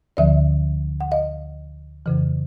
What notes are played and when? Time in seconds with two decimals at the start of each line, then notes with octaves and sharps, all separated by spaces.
0.17 D2 D3 F3 D5 E5
1.01 F#5
1.12 D#5 F5
2.06 F2 C#3 E3